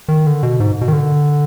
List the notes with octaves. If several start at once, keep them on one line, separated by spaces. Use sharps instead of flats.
D#3
D3
B2
G#2
B2
D#3
D3